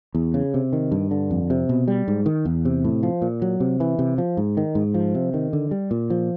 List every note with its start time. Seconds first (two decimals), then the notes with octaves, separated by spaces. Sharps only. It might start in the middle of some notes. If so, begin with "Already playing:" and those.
0.15 E2
0.34 C#3
0.54 C3
0.73 D#3
0.92 G2
1.11 D3
1.31 F2
1.50 C3
1.69 B2
1.88 G3
2.08 G#2
2.26 D#3
2.45 E2
2.65 C3
2.84 A2
3.03 F3
3.22 A#2
3.42 F#3
3.60 C3
3.80 E3
3.99 C3
4.18 F3
4.37 G#2
4.57 D#3
4.75 G#2
4.94 F3
5.15 C3
5.34 D#3
5.53 D3
5.71 G3
5.91 A#2
6.10 F3